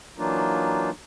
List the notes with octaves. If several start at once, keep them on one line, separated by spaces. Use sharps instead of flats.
E3 F#3 A#3 D4 D#4 F4